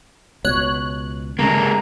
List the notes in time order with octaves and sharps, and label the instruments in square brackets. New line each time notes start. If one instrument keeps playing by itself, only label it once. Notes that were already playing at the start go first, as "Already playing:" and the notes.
[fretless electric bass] C#2 B2 [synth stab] C#5 F#6
[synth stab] C#3 [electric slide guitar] G#3 A#3 [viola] A#5